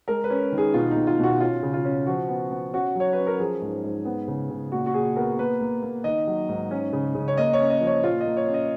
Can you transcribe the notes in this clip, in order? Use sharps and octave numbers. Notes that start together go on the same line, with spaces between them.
G#3 A#4
B4
C#4
D#3
G#4
B2 F4
D#4
B2
F4
B2 F#4
C#4 F4
C#3
F4
C#4
F3 F#4
B3
B3
C#4 F#4
F#3 C#5
C#4 B4
A#4
F3 G#4
G#2
G#2
B3
C#3
C#3
A#2 F#4
F#4
A#2 G#4
B3 A#4
A#3 B4
A#3
A#3
D#3 D#5
F#3
G#2
C#4
C#3
C#3
C#5
A#3 D#5
C#5
C#4
D#5
F3
C#5
A#2 F4
D#5
A#3
C#5
C#4
D#5